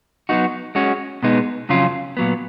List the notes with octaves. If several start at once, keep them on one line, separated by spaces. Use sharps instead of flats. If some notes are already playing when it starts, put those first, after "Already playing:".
F#3 B3 D#4 F#4
G#3 C#4 F#4
B2 G#3 B3 D#4
F2 C#3 F#3 C#4 F4
A#2 F#3 B3